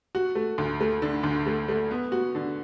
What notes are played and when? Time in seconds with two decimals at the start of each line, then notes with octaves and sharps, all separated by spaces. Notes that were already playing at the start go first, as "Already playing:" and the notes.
0.15 F#4
0.35 A3
0.58 D2
0.81 A3
1.02 D3
1.24 D2
1.46 A3
1.68 A3
1.91 B3
2.12 F#4
2.35 D3